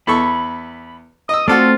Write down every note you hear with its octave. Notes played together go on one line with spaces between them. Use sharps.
E2 A4 B5 C#6
D#5 D#6 E6
A3 C4 F4 F#4 A4 D5